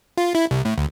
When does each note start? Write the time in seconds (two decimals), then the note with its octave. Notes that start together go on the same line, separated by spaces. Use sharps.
0.17 F4
0.35 E4
0.51 C2
0.65 A2
0.78 D2